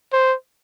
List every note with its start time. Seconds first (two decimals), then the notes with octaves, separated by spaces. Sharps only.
0.13 C5